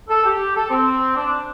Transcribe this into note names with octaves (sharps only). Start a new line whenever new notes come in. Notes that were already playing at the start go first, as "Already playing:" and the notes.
A4
G4
A4
C4
D4